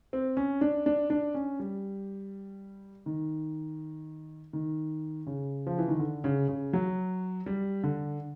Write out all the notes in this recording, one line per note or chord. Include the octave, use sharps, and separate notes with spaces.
C4
C#4
D4
D4
D4
C#4
G3
D#3
D#3
C#3
F3
E3
D#3
D3
C#3
C#3
F#3
G3
D3